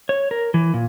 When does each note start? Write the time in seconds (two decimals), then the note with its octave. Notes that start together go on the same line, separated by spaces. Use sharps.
0.09 C#5
0.31 A#4
0.54 E3
0.74 A#2